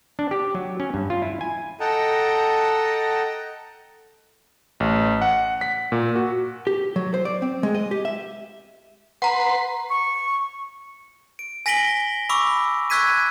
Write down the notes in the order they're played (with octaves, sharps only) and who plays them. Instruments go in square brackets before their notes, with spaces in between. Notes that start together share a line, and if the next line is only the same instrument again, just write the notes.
[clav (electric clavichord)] D4
G4
F#3
C#4
G2
F4
E4
G#5
[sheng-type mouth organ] A4 D#5 F#5 G5 A5 A#5
[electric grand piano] A1
F#5
B6
A#2
F#4
[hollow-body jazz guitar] G4
F#3
C5
D5
C4
G#3
D#5
G4
E5
[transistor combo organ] B4 C6 [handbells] F#5 A#5
[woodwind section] C#6
[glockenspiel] D7
G#5 A#6 B6 D7 F#7 G7
B5 C#6 D6 E6
C#6 E6 F#6 G#6 B6 D#7